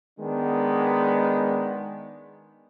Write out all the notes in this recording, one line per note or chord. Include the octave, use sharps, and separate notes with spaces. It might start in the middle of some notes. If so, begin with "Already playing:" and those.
D#3 G#3 B3 D4